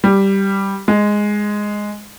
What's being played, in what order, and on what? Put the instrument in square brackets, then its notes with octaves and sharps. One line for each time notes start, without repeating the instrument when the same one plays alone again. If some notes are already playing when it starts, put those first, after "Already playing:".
[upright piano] G3
G#3